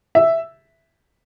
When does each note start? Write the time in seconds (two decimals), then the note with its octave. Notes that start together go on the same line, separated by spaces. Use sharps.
0.15 E5